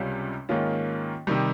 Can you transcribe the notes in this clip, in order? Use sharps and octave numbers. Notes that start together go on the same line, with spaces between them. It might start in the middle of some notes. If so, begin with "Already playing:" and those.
Already playing: C#2 C3 G3 C#4 F4
G#2 D#3 A#3 C#4 F4
C3 D#3 G3